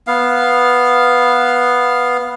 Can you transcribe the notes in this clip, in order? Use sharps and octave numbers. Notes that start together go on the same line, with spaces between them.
B3 F5